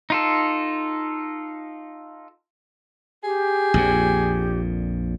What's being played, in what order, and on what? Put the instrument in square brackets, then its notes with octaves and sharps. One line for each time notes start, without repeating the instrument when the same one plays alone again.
[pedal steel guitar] D#4 F4 A4
[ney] G4 [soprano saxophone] G#4
[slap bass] A#1 F2 A#2